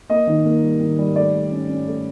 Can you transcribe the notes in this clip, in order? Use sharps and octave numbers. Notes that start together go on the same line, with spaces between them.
A#3 D#5
D#3
A#3
G3
D#3
G3
A3 D5
A3
C#4
C#4
A3